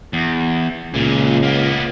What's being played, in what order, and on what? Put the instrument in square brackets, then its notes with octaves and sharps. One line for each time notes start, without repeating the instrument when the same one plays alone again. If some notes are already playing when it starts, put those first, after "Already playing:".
[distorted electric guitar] E2
[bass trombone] C#2 [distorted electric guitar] A#2 C#4
[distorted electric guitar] A#3 B3